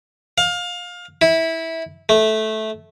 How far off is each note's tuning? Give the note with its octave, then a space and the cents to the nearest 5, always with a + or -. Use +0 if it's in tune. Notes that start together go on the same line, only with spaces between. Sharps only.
F5 +25
E4 -15
A3 -10